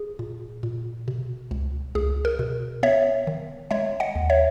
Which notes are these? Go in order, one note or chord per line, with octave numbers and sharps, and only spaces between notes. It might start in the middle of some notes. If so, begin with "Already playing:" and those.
Already playing: G#4
A#2
A#2
B2
C#2
C#2 G#4
A#4
B2
B3 C#5 E5
D#3
G#3 C#5 E5
D#5 F#5
D#2
C#5 E5